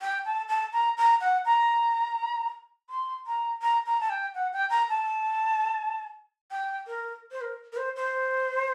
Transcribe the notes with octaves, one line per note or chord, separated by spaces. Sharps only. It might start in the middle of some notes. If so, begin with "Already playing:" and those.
G5
A5
A5
A#5
A#5
F#5
A#5
C6
A#5
A#5
A#5
A5
G5
F#5
G5
A#5
A5
G5
A#4
C5
A#4
A#4
C5
C5